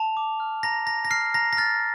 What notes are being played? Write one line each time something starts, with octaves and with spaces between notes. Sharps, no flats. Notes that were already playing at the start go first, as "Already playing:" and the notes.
Already playing: A5 F7
D6
F6
A#5 A#6
A#5 A#6
A#6
F6 C7
A#5 A#6
A#6
F6 A6